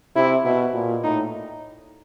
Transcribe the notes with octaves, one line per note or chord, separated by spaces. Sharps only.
C3 E4
B2 E4
A#2
A2 D#4